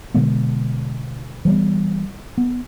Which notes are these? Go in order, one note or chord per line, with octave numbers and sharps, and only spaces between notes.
B2 D3 G#3 B3
E3 G3 B3
B3